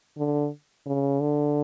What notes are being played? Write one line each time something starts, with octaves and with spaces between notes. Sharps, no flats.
D3
C#3
D3